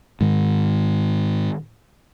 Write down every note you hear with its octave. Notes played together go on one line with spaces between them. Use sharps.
G#2 D#3